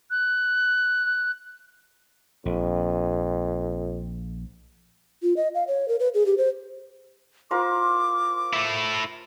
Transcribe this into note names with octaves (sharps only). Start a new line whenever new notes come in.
F#6
A#1 F2
F4
D#5
F5
C#5
A#4
B4
G#4
G4
C5
F4 A#4 C5 D6
A3 E4